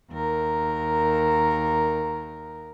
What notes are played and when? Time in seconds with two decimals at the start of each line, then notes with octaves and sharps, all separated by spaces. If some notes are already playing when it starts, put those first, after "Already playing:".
0.11 D#2 A#4